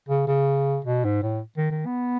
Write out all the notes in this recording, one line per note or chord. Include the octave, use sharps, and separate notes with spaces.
C#3
C#3
B2
G#2
A2
D#3
D#3
B3